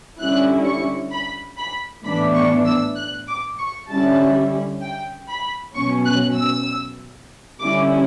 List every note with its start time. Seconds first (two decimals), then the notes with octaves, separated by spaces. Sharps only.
0.19 D3 G3 C#4 E4 F#6
0.64 C#6
1.11 B5
1.57 B5
2.04 A2 E3 B3 D4 B5
2.35 C#6
2.65 E6
2.96 F#6
3.27 D6
3.58 C#6
3.88 D3 G3 C#4 E4 A5
4.81 G5
5.28 B5
5.74 B2 F#3 C#4 C#6
6.05 F#6
6.35 E6
7.59 D3 G3 C#4 E4 D6